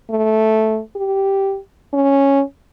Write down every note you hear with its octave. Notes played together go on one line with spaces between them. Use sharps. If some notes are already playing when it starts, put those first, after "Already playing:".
A3
G4
C#4